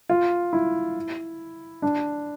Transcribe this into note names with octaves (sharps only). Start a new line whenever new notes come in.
F4
E4
D4